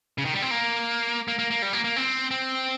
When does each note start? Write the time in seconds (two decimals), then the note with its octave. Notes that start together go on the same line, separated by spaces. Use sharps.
0.18 C#3
0.25 D#3
0.34 G3
0.42 C4
0.51 A#3
1.28 A#3
1.39 A#3
1.50 A#3
1.62 G3
1.73 A#3
1.84 A#3
1.96 C4
2.31 C4